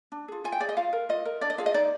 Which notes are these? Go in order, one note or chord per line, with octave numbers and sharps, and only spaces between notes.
D4
F4 G#4
F4 G#5
G5
G#4 D5
D#5
F4 F5
A#4
F4 D#5
A#4
D4 D5
D#5
F4 G#4 F5
D#5
D#4 D5